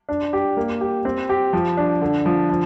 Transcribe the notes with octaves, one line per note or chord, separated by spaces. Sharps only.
D4
G4
A#3
G4
C4
G4
F3
D4
D3
F3
F3